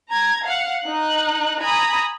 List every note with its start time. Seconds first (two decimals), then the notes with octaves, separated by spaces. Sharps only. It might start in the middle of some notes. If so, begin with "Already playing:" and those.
0.10 A#5 G#6
0.44 F5 F#5
0.83 D#4 F#6
1.61 G#5 A#5 B5 D#6